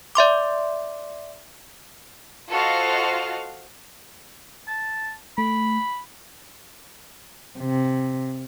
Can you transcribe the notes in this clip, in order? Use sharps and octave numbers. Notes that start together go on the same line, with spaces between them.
D5 E5 C6 D6
F4 F#4 A4 C5 D#5 F5
A5
A3 B5
C3